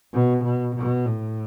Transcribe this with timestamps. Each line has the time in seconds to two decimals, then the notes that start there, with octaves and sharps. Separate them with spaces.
0.14 B2
0.44 B2
0.76 B2
1.06 A2